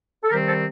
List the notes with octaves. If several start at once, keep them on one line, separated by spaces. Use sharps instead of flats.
A4
C3 D#3 G3 C4 G4 A#4
A4 C5